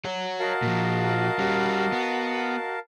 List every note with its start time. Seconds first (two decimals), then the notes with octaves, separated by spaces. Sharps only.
0.05 C#5 F#5
0.39 F#4 A#4 D#5 F5 A5
0.62 A#2 F3
1.39 G3 C#4
1.92 B3